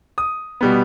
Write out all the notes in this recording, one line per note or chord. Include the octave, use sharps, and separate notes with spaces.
D#6
B2 G3 B3